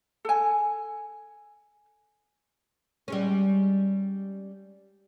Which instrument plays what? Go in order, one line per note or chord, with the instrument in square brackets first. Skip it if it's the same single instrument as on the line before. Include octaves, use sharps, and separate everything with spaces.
[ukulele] A4 G#5
[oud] G3 G#3 C#4